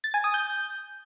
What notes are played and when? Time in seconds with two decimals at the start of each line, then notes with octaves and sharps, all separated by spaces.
0.04 A6
0.14 G#5
0.24 D#6
0.34 G6